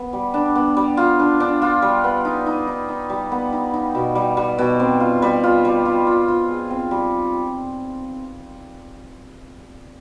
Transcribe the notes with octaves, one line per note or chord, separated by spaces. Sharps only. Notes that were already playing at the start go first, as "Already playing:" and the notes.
Already playing: B3
G3
D4
B3
G3
F4
D4
D4
F4
G3
B3
D#4
D#4
D#4
D#4
G3
B3
D#4
D#4
B2
G3
G3
B2
C4
F4
G3
F4
G3
F4
F4
F4
G#4
C4
G3